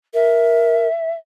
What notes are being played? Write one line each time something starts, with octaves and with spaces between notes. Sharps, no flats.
A#4 E5